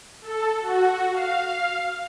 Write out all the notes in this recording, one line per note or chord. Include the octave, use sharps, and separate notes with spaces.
A4
F#4
F5